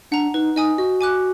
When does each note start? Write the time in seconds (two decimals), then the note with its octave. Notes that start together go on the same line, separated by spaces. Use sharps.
0.11 D4 F#5 A#5
0.34 D#4 B4
0.56 D#4 D#5 G#5 D#6
0.78 F#4 D#5
1.01 G#5 D6 F#6